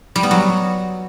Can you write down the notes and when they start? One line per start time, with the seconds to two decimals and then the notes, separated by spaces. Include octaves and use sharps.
0.16 G3
0.23 B3
0.31 F#3